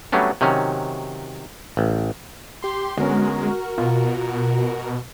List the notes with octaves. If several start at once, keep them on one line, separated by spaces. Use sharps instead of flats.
F#3 G3 A3 B3 C#4 D4
C3 D#3 F#3 C#4
A1
G4 C6
D3 G#3 B3 C#4 F#4 A#4
B2 F4